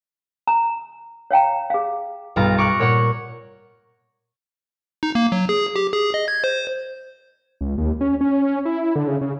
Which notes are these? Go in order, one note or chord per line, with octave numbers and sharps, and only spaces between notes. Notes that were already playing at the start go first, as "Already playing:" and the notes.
A#5
C#5 F5 G5 A#5
G#4 F5
B1 G2 F4 F5 A#5
A#5 C#6 D6 F6 F#6
A#2 C#5 F#5 C#6
D#4
A#3
F#3
G#4
G4
G#4
D#5
G#6
C5
C#2
D#2
C#4
C#4
E4
D3
C#3
C#3